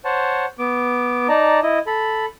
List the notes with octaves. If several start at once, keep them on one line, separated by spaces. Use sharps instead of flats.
C5 C#5 F#5 A5
B3 D6
D#4 D5 A5 A#5
E4 D#5
A4 B5